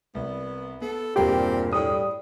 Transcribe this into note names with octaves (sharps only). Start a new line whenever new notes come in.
C2 B3
B3 A4
E1 G2 A#2 C4 G4 A#4
A2 G3 D#6